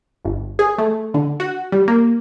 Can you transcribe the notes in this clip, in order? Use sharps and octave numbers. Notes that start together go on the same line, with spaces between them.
G1
G#4
A3
D3
F#4
G3
A#3